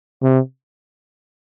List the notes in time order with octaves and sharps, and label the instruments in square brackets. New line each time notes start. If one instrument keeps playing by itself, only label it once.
[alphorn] C3